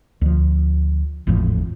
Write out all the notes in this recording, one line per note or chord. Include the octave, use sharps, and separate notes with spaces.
D2 F3
G#1 E2 A2 F3